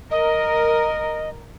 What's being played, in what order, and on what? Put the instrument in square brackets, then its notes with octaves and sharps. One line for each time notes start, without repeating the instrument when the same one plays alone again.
[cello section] A#4 [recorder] D#5